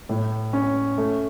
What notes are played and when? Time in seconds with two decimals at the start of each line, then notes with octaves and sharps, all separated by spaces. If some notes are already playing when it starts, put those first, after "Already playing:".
0.09 A2
0.53 C#4
0.98 A3